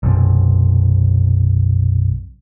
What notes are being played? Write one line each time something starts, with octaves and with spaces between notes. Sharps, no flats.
B1 F#2 C3